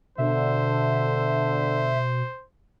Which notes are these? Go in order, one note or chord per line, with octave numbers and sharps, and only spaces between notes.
B2 D3 C5 E5